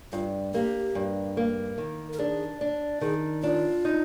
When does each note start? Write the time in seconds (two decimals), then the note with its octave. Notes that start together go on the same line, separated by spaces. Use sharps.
0.13 G2 F4
0.54 A#3 G4
0.95 G2
1.37 A#3
1.78 D#3
2.13 A#4
2.19 D4 G#4
2.61 D4
3.01 D#3 G#4
3.43 D4 F4
3.85 D#4